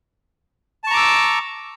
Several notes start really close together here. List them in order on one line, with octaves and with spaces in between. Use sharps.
A5 C#6 A#5 D6 E6